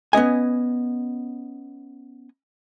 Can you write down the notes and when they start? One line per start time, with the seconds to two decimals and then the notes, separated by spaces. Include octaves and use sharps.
0.13 B3 C#4 D#5 G#5